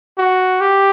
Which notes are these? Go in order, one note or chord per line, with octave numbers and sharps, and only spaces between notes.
F#4
G4